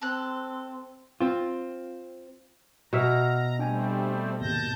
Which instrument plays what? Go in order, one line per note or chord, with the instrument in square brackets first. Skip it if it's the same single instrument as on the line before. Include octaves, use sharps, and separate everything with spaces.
[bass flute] C4 [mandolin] A4 F#6
[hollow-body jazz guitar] C4 F4
[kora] B2 E5 [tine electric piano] F#5 F6 [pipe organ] A#5
[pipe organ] G3 A3 C4 [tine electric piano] D4 G5 G#5
[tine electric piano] D#2 G#2 C3 [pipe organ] A5 G6 A#6